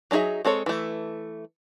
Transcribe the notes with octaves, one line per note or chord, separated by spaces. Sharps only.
F#3 D4 D#4 G#4 E5
G#3 C4 A4 C#5
E3 A3